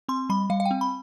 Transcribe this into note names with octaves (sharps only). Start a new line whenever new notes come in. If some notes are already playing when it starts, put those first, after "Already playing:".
C4 C6
G3 B5
G3 F5
F5
G5
C4
B5